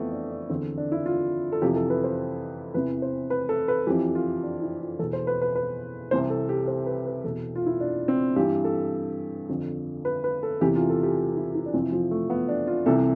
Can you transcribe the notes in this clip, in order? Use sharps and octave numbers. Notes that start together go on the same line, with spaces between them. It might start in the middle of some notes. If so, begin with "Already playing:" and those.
Already playing: F2 E3 A3 B3
D4
D4
E2 D3 C4
D4
E4
F4
A4
F2 C3 E3 G4
A4
B4
C5
E2 C3 E3 B4
C5
B4
A4
B4
F2 E3 G4
F4
D4
E4
F4
E2 B2 A4
C5
B4
B4
B4
C2 C3 E3 C5
A4
G4
C5
B4
B4
E2 B2 A4
F4
E4
D4
C4
G2 E3 G4
A4
F2 D3
B4
B4
A4
E2 C3 E3 G4
F4
A4
G4
F4
E4
E4
D4
F2 C3 E3 C4
F3
A3
B3
D4
F4
C2 C3 E3 A4